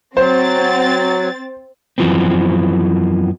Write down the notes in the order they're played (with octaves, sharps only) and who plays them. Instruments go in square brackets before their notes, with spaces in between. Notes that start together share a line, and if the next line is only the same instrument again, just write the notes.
[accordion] F#3 [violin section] C4 A6 [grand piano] C5
[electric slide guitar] F#2 E3 F3 B3 C4